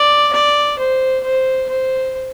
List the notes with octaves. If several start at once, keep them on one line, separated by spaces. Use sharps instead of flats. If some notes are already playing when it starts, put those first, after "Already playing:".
Already playing: D5
D5
C5
C5
C5